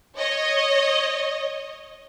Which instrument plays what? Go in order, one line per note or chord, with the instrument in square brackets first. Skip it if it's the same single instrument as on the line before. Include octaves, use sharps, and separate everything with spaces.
[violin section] C#5 D#5